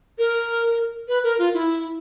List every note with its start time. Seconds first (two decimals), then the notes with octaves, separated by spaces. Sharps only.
0.18 A#4
1.08 B4
1.23 A#4
1.39 F4
1.54 E4